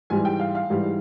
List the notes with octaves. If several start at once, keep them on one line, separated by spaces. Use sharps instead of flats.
G#2 E3 G3 G#5
G5
F5
F5
G#2 E3 G3